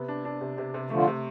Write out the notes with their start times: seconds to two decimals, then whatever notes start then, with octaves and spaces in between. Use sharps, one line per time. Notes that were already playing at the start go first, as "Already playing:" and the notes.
Already playing: C3 B3
0.08 D4
0.25 D4
0.41 C3
0.58 C3
0.74 C3
0.90 D3 F3 A3
1.07 C3